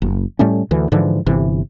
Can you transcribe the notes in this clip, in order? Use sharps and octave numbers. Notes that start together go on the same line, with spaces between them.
F#1
A2 G3 A3 C#4
D2 E3
G#2 D3 E3 F3
G1 C3 E3